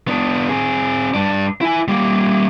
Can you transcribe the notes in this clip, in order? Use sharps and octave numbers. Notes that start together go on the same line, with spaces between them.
B3 D4
C4 G#4
G2 D4
E4 G#5
G3 A#3